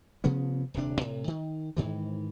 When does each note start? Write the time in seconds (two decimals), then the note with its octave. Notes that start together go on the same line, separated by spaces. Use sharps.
0.24 C3 F3 B3 C#4
0.74 D#1 G2 C3 D4
1.01 A2 C3
1.28 D#3
1.77 G#2 D#3 E3